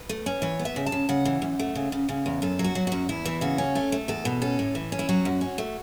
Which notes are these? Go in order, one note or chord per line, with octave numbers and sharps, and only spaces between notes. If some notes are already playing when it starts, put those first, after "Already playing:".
Already playing: B4
A3
C#4
E3 C#5
B3
E5
C#3
A5
C#3
C#3 F#5
E3
F#2
A3
C#3
C#3
C#3
E2
F#2 A4
F#3
F#4
F#3
F#2 F#4
E2 E4
E3
C#3 F#4
C#4
A3 A4
A3
E2 A4
B2
C#4 A4
A2
E3
C#4
E4
F#3 F#4
F#2
C#4
A3